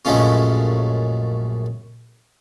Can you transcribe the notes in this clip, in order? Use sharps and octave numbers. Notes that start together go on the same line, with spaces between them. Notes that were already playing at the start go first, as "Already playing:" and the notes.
A#1 F#2 G#3 A3 C#4 F4